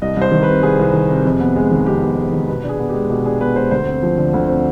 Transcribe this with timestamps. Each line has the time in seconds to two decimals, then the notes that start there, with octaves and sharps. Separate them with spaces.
0.02 C2 D#5
0.17 C2 C5
0.32 D#3
0.43 C3 B4
0.63 C2 G#4
0.79 C2
0.93 D#3
1.09 C3
1.25 F2
1.40 B3
1.56 G#3
1.71 D#3
1.86 F2 G4
2.02 B3
2.17 G#3
2.33 D#3
2.48 B2 B4
2.63 D4
2.69 G#4
2.79 B3
2.89 G4
2.94 G#3
3.10 B2 G4
3.26 D4 G#4
3.40 B3 B4
3.56 G#3 C5
3.71 D2 C5
3.87 C4
4.03 F3
4.18 D3
4.34 D2
4.48 C4